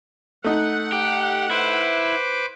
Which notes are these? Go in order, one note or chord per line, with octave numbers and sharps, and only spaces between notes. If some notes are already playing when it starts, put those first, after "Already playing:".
A3 D#4 F#5
G4
E4 B4 C5 D6